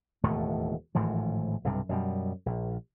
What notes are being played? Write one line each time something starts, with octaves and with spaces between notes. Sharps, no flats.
E1 D#2 A2 A3
G#1 A2 E3 F3
B1 G2 C3
F#2 B2 G3
A#1